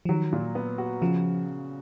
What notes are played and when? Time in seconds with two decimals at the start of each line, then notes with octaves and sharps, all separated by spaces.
0.05 F3
0.09 D#3 F#3
0.33 A#2
0.55 B3
0.78 F#4
1.02 C#3 F3